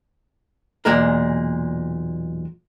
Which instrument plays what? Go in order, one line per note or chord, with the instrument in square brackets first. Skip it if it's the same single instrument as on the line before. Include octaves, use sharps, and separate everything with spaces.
[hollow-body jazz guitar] B1 E2 A#2 G#3 A#4